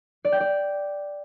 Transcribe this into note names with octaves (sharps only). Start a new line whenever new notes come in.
D5
G5
D5